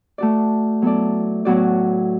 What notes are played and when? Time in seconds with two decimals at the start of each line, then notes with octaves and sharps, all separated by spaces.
0.18 A3 F#4 D5
0.82 F#3 B3 E4 A4 D5
1.45 A2 F#3 B3 F#4 D5